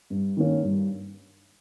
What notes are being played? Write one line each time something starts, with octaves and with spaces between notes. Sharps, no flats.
G2
D#3 A#3 C#4
G2